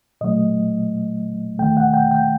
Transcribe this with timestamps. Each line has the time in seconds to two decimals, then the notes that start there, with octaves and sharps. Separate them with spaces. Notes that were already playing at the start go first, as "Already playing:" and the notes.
0.21 A#2 F#3 A3 D#5
1.58 D#2 D#3 A3 G5
1.77 F#5
1.94 G5
2.11 G5